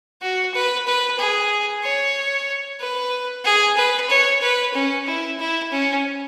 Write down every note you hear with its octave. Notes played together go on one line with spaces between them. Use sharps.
F#4
B4
B4
G#4
C#5
B4
G#4
B4
C#5
B4
C#4
E4
E4
C#4